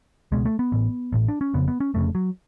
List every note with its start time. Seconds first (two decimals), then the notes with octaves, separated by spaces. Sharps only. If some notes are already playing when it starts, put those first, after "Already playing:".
0.32 C#2 B2 G#3
0.45 A3
0.59 B3
0.72 A1 A2
1.13 A1 A2
1.28 D4
1.41 C#4
1.54 F1 F2 C#3 B3
1.68 B3
1.80 C#4
1.94 F1 F2 C#3 A3
2.15 F#3